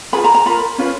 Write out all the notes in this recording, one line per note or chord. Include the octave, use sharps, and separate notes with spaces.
F4 G#4 B4 B5
A#5
A#5
F4 A#4 B5
C#4 F4 B4